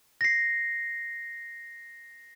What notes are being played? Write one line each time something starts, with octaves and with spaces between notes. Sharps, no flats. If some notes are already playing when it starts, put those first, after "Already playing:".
A#6 C7